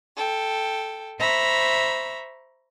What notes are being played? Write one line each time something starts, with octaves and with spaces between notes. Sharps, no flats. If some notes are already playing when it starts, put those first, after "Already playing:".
A4 G5
C5 E5 A#5 B5 C#6